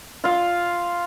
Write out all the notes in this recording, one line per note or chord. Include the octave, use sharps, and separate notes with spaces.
F4 F5